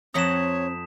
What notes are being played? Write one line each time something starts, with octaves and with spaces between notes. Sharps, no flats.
F2 C4 C#5 F#5 A#5 D#6 B6 E7